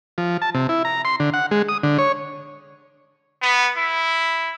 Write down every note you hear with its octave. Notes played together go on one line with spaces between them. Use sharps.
F3
A5
C3
E4
A#5
C6
D3
F#5
G#3
D#6
D3
C#5
B3
E4